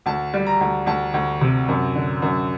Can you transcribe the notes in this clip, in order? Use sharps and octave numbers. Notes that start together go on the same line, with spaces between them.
D2 A5
G3
A#5
D2
D2 A5
D2
C3
F#2
D3
F#2